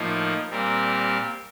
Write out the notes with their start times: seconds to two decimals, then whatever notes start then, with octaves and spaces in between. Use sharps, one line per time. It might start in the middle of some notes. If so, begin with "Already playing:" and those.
Already playing: A2 F3 A#3 D#4
0.50 A#2 G3 C4 G4 A#4